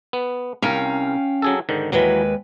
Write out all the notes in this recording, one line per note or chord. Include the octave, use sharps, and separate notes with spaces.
B3
C2 C#4 A#4 F5 G5
F#3 G#4 A4
G#2 D3 D#3
D#2 E3 F#3 G#3 B4